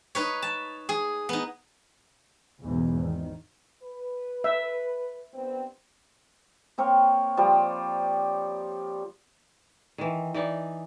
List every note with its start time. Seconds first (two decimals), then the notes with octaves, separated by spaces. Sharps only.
0.15 D#4 B4 C#5
0.42 A5
0.89 G#4
1.29 B3 D#4
2.62 B1 E2 G#2 B2
2.99 G#1 D#3
3.83 B4
4.44 E5
5.34 G2 B3 C4
6.78 A#3 C4 A#4 C#5
7.37 F3 G3
9.98 D#3 E3
10.34 E3 D#4 D5